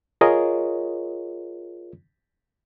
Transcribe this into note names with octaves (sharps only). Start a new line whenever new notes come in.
F4 G#4 A#4 C#5 D#5